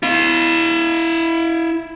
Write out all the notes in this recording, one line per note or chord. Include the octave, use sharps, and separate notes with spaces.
E4 F5